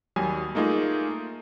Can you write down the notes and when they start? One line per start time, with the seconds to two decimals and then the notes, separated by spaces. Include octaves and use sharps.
0.16 D#2 F#3 G3 G#5 D#6
0.55 A3 A#3 D#4 F4 G#4